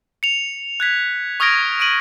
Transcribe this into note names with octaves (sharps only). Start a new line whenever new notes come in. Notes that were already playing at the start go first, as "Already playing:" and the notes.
C#7 F7
F#6 G#6 B6
C#6 D#6 F6 G#6 A#6 D7
D#6 D7 D#7 F#7